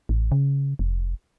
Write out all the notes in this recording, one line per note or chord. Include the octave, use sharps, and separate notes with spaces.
A1
C#3
F1